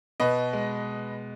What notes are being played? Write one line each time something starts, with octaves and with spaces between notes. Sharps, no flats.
B2 B4 D#5
G#3